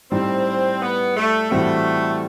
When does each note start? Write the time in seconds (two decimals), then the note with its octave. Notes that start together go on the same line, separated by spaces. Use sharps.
0.11 A2 G3 C4 D#4
0.82 B3
1.17 A3
1.51 A2 E3 G3 A3 C4 F#4